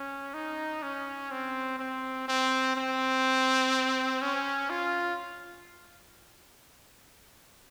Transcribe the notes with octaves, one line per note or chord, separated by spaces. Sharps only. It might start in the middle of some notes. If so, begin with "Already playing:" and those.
Already playing: C#4
D#4
C#4
C4
C4
C4
C4
C#4
F4